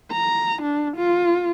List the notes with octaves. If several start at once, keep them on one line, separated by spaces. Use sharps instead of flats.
A#5
D4
F4